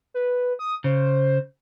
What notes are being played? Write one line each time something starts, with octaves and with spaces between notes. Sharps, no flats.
B4
D#6
C#3 C5